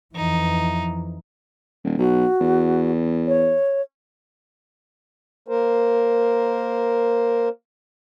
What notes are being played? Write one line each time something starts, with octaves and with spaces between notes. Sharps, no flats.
F2 E3 D#4
D#1
B1 F#4
E2
C#5
A#3 A#4 C5